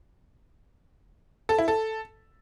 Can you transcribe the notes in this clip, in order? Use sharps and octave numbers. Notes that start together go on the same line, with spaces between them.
A4
E4
A4